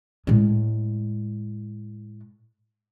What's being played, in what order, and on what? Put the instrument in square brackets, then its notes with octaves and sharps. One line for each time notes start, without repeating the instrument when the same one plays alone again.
[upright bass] A2 G#3